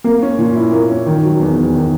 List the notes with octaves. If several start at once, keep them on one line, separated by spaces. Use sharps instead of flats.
A#3
C#4
A#2
E4
A#3
C#4
D#3
F#3
E2
E2
D#3